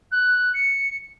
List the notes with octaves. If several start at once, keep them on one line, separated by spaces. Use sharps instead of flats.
F#6
C#7